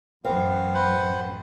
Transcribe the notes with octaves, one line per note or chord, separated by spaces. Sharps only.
A1 F#2 B3 C4 F5
B4 C5 F#5